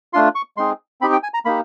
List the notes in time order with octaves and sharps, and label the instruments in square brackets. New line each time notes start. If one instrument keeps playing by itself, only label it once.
[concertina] A3 D4 F4 C6
C#6
G#3 C4 D#4 G#4 C6
C4 D#4 G4 B5
G5
G#5
A#5
A#3 D#4 G4 B5